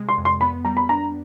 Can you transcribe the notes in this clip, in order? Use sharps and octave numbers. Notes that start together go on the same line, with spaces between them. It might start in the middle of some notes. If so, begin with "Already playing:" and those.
Already playing: C3 G#3
C6
F2
C6
B3 B5
G3 A#5
B5
D4 A#5